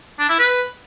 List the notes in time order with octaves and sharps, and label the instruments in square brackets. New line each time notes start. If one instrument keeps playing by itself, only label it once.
[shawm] D4
E4
B4